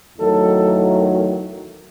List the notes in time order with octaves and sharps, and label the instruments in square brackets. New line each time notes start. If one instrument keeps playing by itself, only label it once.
[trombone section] E2 D#3 F#3 A3 A4